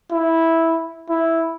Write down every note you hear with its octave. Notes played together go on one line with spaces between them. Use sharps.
E4
E4